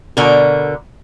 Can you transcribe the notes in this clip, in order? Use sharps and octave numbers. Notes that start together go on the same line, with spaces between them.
B2 D3 A#4